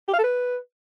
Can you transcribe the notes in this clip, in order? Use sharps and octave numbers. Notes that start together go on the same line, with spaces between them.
G4
F5
A4
B4